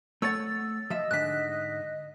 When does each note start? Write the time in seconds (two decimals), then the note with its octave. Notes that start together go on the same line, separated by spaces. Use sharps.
0.22 A3 C#5 F#5 E6 A6
0.90 F3 D#5 E5
1.11 G#2 D3 F#6 B6